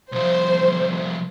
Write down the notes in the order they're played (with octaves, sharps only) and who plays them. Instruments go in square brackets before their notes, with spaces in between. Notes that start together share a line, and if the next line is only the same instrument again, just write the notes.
[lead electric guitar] C2 F3 [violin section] C5